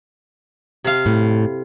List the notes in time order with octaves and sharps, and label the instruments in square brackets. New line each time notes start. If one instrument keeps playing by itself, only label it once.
[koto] C3 F5
[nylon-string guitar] A2